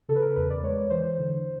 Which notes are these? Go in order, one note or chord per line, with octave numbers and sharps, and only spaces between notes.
C#3 A4
B4
A#4
E2 B4
D5
G#3 C#5
E3 C5
D3